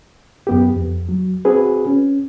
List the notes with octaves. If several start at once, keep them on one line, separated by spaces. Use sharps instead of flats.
F#2 B3 G4
F2
F#3
C4 F#4 G#4 B4
C#4